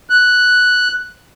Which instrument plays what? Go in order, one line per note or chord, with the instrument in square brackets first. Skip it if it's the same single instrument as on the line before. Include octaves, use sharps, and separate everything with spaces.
[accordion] F#6